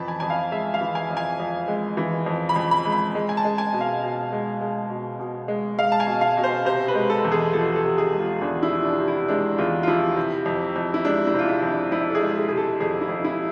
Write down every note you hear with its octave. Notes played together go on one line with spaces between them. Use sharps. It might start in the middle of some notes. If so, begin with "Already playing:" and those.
Already playing: F2 E3 A5 B5
G#5
F2 G#5
F5
G#3 E5
F5
E3
G#5
F2
G#5
F2
G#3
E3
F2
B5
F2
B5
G#3
B5
G#3
G#5
A5
G#3
G#5
B2
F5
B2
G#3
G#3
B2
B2
G#3
G#3 F5
A5
G#5
B2
F5
B2
C5
C3 C5
B4
G#3
A4
E2
G#4
F3 A4
A4
C3
G#4
G#3
F4
E2 D4
E4
F3
D4
C3
E4
G#3 D4
E2 F4
F4
F3 E4
C3
F2
F2
E4
G#3 D4
E4
C3 F4
E4
F2
D4
F2 E4
A4
G#4
G#3
G#4
C3 G#4
A4
F2 G#4
E4
F2
E4